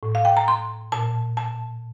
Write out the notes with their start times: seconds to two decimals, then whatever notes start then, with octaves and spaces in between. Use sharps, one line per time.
0.03 A2
0.15 F5
0.25 G5
0.37 A#5
0.48 C6
0.92 A#2 A5
1.37 A5